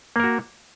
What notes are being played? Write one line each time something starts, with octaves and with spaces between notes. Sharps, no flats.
A#3 F#4 A#4